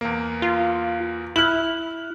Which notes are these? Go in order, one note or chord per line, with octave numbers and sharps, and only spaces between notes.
E2 A#3
F4
E4 F6 F#6 F#7